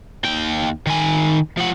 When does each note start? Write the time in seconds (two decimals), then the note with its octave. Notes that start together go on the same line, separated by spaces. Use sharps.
0.25 D#2 G5
0.87 D#3 G#5
1.58 F3 F#5